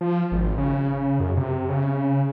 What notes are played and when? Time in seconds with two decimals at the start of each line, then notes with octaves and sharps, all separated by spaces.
0.01 F3
0.32 G#1
0.58 C#3
1.20 F#2
1.37 C3
1.69 C#3